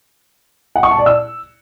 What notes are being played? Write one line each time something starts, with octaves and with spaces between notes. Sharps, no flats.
F#5
C#6
A5
D5
E6